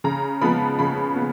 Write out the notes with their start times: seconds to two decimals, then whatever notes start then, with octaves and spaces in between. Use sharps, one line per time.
0.04 C#3 A#5
0.41 F3 G#3 B3 B5
0.79 C#3 B5
1.16 B3